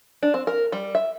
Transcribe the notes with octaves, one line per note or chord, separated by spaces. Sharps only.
D4
C4
A#4
G3
E5